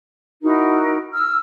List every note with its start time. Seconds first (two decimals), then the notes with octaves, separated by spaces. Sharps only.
0.43 D#4 E4 F#4 A#4
1.13 E6 F6